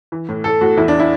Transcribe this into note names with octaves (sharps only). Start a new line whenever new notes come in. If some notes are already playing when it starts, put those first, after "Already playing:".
E3
A2
A2 A4
A2 F#4
E2 E4
D4
E4